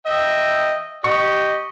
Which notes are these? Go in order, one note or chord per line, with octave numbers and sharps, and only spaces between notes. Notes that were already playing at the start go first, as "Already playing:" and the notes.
D#5 E5 G5
G4 D#5 C#6